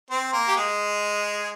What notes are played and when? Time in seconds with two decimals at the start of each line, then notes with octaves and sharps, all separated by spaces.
0.10 C4 C5
0.33 A#3 A#4
0.48 G4
0.56 G#3 G#4